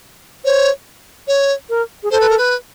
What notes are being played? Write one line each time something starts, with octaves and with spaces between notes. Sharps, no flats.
C5 C#5
C#5
A#4
G#4
A4 C5
B4
A#4
B4